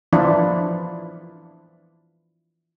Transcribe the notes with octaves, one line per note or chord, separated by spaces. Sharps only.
E3 F3 D4 E4 F4